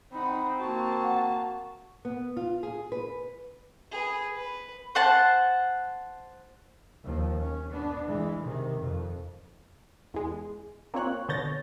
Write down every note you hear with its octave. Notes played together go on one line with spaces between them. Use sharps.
C4 D#4 F#5 B5
A#3 F#4 A5
F#5
B3
F4
G#4
B4
G#4 B4
B4
C5 F#5 A5
D#2 F3
C#4
B3 D4
E3 G#3
C3 D#3
F2
E2 G#3
A#3 C4 F4 C#5 F#6
B2 D3 C#5 G6 A6 A#6